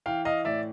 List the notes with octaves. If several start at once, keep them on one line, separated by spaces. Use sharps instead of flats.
E3 F5 G5
D#5 F5
A2 D5 E5